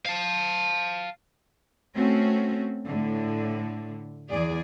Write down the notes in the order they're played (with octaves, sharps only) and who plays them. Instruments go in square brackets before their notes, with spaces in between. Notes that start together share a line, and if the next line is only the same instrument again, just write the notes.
[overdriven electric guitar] F5 A5
[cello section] A3 C4 C#4 F#4
A2 D3
E2 G#4 D5